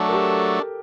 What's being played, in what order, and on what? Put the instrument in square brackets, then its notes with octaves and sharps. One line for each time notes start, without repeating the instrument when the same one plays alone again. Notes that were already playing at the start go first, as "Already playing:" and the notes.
Already playing: [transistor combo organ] F#3 A3 D4
[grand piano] A#4
G4 A4